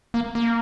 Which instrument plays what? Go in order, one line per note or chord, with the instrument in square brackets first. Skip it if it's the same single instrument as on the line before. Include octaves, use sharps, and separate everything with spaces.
[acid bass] A#3
A#3